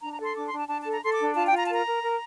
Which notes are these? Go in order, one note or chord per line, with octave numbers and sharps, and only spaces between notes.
D4 A#5
A#5
A4
C6
D4 D6
C6
D4
A5
D4 A5
A4 A5
A#5
A4 C6
D6
D4
F4 A5
G5
F4
A#5
A5
A#4 A#5
A#4
A#4